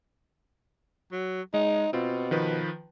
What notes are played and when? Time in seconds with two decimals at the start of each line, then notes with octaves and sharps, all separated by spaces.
1.12 F#3
1.54 G#3 D#4
1.93 B2 C4 F4
2.31 D#3 F3 B4